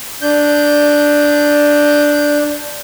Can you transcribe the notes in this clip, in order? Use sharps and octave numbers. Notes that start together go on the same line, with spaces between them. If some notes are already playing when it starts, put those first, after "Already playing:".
D4 G6